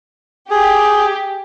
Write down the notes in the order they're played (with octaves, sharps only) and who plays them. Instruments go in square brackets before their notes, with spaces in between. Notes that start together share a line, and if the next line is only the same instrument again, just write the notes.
[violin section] G4 [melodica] G#4